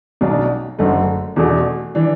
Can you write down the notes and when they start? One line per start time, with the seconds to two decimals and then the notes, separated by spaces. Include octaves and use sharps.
0.21 B1 B2 F#3 D4
0.79 F#1 F#2 D3 A3
1.36 E2 B2 A3 D4 F#4
1.95 E3 D4